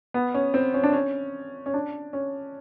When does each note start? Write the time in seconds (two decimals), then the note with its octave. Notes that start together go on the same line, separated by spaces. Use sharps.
0.14 B3
0.34 C#4
0.54 C4
0.74 C#4
0.84 D4
0.93 C#4
1.66 C#4
1.74 D4
2.13 C#4